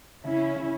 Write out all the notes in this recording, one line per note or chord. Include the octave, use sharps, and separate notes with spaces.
C#3 C#4 E4
C#3